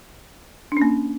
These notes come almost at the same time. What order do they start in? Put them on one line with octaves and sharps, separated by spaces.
D4 C#4 A#3